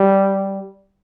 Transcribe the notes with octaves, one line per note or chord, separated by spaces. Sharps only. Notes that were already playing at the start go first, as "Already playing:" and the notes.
Already playing: G3